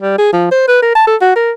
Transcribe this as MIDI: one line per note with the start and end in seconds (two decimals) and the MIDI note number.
0.02 0.15 55
0.18 0.32 68
0.33 0.48 53
0.51 0.63 72
0.68 0.81 71
0.82 0.92 70
0.95 1.06 81
1.07 1.16 69
1.21 1.34 66
1.36 1.51 70